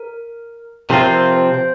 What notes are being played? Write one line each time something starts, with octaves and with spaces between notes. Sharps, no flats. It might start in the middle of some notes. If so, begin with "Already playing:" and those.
Already playing: A#4
C3 F3 C4 F4 A#4
C5
C5
C5